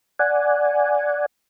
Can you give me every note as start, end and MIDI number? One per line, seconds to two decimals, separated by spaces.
0.19 1.26 74
0.19 1.26 78
0.19 1.26 80